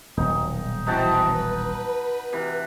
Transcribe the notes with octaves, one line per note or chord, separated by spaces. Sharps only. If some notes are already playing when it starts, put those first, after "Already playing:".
D#1 B1 D#4
E3 C4 D#4 F#4 A5
B4
C3 E3